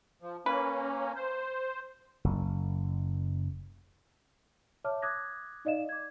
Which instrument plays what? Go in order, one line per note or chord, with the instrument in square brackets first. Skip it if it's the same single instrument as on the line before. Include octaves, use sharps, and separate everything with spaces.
[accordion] F3
[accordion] A#3 C#4 [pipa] B4
[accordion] C5
[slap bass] F#1
[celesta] C#5 E5 A5 D6 F6
D6 D#6 F#6 G#6 A#6
D#4 D5 D#5 F5 E7
D6 G#6